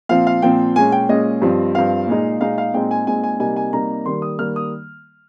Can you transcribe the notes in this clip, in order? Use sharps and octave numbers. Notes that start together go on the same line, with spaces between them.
A#2 F3 C4 F5
F5
A#2 F3 C4 G5
A#2 G#3 C#4 G#5
G5
A#2 G#3 C#4 D#5
G2 F3 C4
G2 F3 C4 F5
A#2 G#3 D#4
A#2 G#3 D#4 F5
F5
A#2 G#3 C4 D#4 G5
G#5
A#2 G#3 C4 D#4 G#5
G#5
C3 G3 A#3 D#4 G#5
G#5
C3 G3 A#3 D#4 A#5
D#3 G3 A#3 C6
D#6
D#3 G3 A#3 F6
D#6